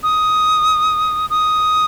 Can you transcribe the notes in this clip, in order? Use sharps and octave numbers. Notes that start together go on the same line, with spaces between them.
D#6
D#6